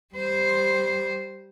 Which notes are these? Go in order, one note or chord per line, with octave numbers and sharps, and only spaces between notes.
G3 C5